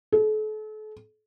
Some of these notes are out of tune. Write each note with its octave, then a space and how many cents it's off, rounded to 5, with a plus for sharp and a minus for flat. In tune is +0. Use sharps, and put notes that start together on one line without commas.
A4 -40